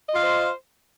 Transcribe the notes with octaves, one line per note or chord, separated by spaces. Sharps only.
F4 C5 D#5 F5